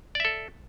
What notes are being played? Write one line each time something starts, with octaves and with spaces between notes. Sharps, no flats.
A4 D5 E5